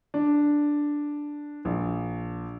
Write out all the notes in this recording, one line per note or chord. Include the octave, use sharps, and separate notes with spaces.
D4
A#1